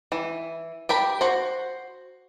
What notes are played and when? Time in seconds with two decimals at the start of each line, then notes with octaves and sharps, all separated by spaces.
0.12 E3
0.89 G4 A#4 B5
1.21 F#4 C5